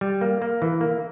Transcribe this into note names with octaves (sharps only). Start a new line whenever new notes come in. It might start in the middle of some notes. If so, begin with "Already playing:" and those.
G3
A#3
A#3
E3
A#3